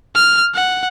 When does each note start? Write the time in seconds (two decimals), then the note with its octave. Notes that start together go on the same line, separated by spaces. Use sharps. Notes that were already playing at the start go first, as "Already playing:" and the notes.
0.15 F6
0.54 F#5